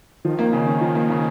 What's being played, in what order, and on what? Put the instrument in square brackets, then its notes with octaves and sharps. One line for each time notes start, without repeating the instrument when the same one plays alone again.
[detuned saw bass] D#3 [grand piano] F3
[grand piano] A#3
C#3
C#4
F3
A#3
C#3